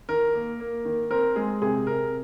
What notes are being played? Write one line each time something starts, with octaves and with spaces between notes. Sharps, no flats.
D#3 A#4
A#3
A#3
D#3
C4 A#4
G#3 G#4
C3 G#4
C3 A#4